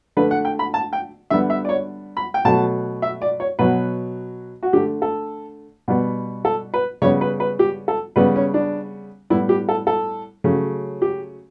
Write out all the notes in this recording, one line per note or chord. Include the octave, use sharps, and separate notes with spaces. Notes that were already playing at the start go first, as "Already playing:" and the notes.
D3 A3 B4
F#5
G5
B5
A5
G5
D3 G3 B3 E5
E5
D5
C#5
B5
G5
B2 F#3 A3 A5
E5
D5
C#5
B2 F#3 B3 B4
F#4
D3 A3 G4
A4
B2 G3 B3
A4
B4
C#3 G3 B3 C#5
B4
B4
G4
A4
C#3 G3 B3 B4
C#4
D4
A2 G3 B3 E4
G4
A4
A4
C#3 F#3 A3
G4